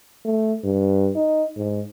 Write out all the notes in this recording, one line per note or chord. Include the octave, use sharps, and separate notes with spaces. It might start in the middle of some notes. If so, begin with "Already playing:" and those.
A3
G2
D#4
G#2